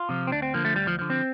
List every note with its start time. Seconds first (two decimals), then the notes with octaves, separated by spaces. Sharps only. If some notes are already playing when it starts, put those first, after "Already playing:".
Already playing: F4
0.09 C3 F3
0.27 C4
0.31 D2 D4
0.42 C4
0.54 D3 F3 A#3
0.65 A3
0.76 D2 G3
0.87 F3
0.99 D3 F3
1.10 C4